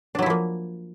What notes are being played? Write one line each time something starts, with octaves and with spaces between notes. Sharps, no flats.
F3 F#3 A#3 D4 E4